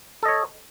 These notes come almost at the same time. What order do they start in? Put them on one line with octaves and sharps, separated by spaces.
A4 D#5 C#5